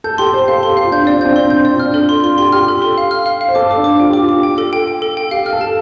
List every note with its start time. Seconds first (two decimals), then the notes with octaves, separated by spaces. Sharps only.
0.04 A4 G6
0.18 G4 C6
0.33 C5 C6
0.48 A4 F5
0.63 C6
0.70 G4
0.77 F5
0.85 F4
0.92 D4 G6
1.03 C4
1.07 D5
1.14 D4
1.21 C4 G6
1.36 D4 C6
1.50 G6
1.58 C4
1.65 D5
1.73 F4
1.80 D4 F6
1.94 A4
2.09 C6
2.23 F4 C6
2.38 G4 C6
2.52 G4 F6
2.68 A4
2.82 C6
2.98 F5
3.11 F6
3.26 F5
3.41 F5
3.48 C5
3.55 A4 D6
3.71 D6
3.77 D4
3.84 D6
4.00 F4 G5
4.10 G4 D6
4.21 F4
4.29 D6
4.43 G5
4.58 A4
4.73 G5
4.87 G5
5.02 A4
5.17 G5
5.31 G4 F5
5.46 F6
5.53 A4
5.61 A5